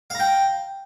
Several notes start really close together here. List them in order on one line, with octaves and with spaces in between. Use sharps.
F5 A#5 G5